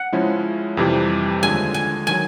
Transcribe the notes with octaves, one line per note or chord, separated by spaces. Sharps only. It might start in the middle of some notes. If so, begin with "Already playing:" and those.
Already playing: F#5
C#3 F3 G#3 C#4 E4
F2 C3 E3 G3
D#2 D3 F3 G#3 G#5
G#5
D#3 F#3 G#5